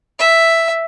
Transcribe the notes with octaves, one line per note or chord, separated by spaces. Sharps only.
E5